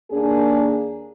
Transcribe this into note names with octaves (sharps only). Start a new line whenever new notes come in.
D#2 A#3 D4 G#4